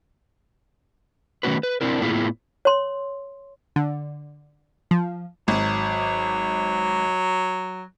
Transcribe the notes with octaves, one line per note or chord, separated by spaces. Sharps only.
D#3 A3 B3 C#4 F#4 B4
B4
C4 D4 E4 A#4
A2 A#3 B3 E4 F4 G#4
C#5 C6
D3
F3
G#1 F#3